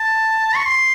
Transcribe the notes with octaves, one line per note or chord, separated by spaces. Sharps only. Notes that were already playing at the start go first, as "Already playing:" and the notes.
Already playing: A5
C#6
C6